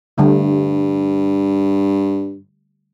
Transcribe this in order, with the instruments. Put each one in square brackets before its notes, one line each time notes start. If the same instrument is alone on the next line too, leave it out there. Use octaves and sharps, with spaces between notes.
[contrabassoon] G2 [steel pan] D3 G3 A3